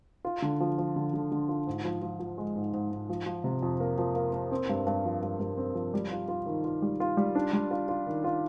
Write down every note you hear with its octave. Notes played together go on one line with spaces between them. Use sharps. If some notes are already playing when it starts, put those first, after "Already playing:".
F4
D3
F3
F3
D3
D3
D3
F4
G#2
F3
F3
F3
G#3
G#2
G#2
G#2
F3
F3
C3
F2
A#3
F3
A#3
A#3
C4
G2
G2
F3
G2
G2
C4
F3
G3
F4
F4
D#3
F4
G3
F4
G3
D4
G3
F4
F4
D#3
F4